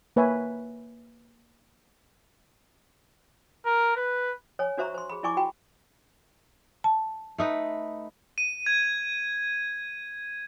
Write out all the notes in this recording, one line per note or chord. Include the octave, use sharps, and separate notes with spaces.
A#3 B4 C#5 E5 G#5
A#4
B4
C#5 G#5
D4 F#4 C5 E5 A#5 C#6
C5 C6
G#4 B5
E4 D5 G#5 C#6 D6
F#4 G5 B5
A5
A3 D#4 B4
D#7
G#6